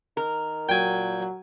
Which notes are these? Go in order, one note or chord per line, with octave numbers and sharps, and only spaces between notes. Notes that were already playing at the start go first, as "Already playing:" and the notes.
D#3 A#4
A#2 F#3 G5 G#5